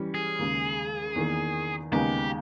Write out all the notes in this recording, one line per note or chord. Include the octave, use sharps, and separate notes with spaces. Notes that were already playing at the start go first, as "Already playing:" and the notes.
Already playing: E3 G3 C#4
G#4
D#2 C#3 G#3
E2 D#3 A#3
D#2 C#3 G#3 B3 D#4 G4